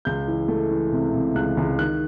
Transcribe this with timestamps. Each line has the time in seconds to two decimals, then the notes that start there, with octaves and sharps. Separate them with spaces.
0.05 C#2 G6
0.28 E3
0.48 A3
0.71 E3
0.92 C3
1.14 C3
1.35 C#2 F#6
1.57 C#2
1.79 D#3 F#6